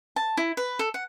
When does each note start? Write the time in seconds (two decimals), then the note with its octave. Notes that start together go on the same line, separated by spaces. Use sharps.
0.16 A5
0.37 E4
0.57 B4
0.79 A4
0.94 F#5